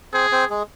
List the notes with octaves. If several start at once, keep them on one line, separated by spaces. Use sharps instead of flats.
C4 G#4 C5
C4 C5
G#3 G#4